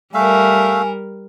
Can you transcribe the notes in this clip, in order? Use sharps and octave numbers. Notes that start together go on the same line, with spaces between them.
G3 A3 A#4 E5 F5 G#5